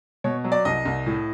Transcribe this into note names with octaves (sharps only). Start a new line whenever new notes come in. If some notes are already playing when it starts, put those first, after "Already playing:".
B2 C#5
F#3
D5
C2 D#5
C2
A2